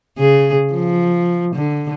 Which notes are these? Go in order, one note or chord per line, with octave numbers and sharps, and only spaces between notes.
C#3 G#4
F3
D3